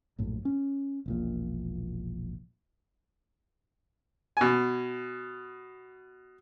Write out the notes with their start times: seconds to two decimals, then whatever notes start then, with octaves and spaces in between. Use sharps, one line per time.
0.18 A#1 F#2 A2
0.45 C#4
1.06 E1 A#1 A#2
4.37 B2 G#5